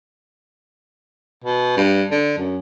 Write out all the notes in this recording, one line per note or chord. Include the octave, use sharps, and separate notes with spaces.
B2
G2
D3
F#2